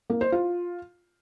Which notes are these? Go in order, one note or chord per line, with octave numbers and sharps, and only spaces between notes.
A#3
C5
F4